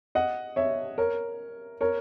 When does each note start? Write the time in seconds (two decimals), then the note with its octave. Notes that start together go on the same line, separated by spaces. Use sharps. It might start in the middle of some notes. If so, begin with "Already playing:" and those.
0.15 D#5 F#5
0.56 C#5 E5
0.98 A#4 C#5
1.81 A#4 C#5